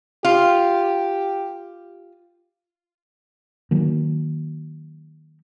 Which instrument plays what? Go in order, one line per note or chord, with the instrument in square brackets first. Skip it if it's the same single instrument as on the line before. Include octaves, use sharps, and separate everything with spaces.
[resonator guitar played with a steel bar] F4 [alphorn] G4
[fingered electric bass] D#3 F#3 A#3